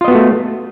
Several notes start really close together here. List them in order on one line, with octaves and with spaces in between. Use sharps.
F4 D#5 B3 F#4 A3